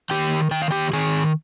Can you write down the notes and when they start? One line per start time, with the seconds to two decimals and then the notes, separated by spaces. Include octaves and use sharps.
0.10 D#3 G4 G5
0.51 D#3 G5
0.62 F5
0.71 G4 G5
0.93 D#3 G#4 G#5